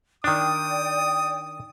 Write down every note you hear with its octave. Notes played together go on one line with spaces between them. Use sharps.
D#3 D4 D5 G5 D#6